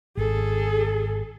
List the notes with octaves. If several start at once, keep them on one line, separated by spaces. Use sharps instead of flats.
G#1 G#4 A4